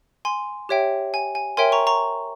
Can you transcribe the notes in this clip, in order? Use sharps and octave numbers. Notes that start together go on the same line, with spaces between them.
G#5 C6
G4 C#5 E5 G5
G#5
G#5
A#4 C#5 E5 G5 G#5 C6
A#5 C#6
A#5 C#6